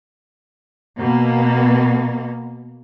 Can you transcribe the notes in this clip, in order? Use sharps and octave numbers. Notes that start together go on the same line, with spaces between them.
B2 A#3